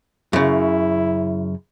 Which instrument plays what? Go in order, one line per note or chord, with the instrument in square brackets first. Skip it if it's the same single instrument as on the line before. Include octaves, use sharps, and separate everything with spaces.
[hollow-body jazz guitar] F#2 C#3 [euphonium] E4